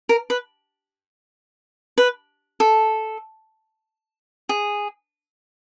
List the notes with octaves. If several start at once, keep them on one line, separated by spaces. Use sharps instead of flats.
A#4
B4
B4
A4
G#4